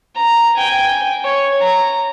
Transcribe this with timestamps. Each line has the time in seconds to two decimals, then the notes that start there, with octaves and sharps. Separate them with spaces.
0.15 A#5
0.57 G5 G#5
1.23 C#5
1.60 A#5